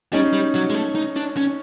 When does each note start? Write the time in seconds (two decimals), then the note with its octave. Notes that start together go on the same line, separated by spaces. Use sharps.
0.13 G3 C#4 D#4
0.33 G3
0.55 F#3
0.70 G#3
0.74 A3
0.95 D#4
1.16 D4
1.37 C#4